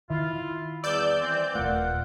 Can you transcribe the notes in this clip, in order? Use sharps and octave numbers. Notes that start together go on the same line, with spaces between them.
D#3 E4 F4
E2 G3 D5 E6 G6
E3 C4
D#1 A3 F4 A#4 F#5